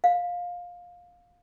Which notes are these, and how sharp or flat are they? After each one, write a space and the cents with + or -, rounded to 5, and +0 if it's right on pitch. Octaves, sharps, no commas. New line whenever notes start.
F5 +15